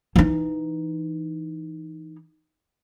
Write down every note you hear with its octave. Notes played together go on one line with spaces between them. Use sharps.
E3 D#4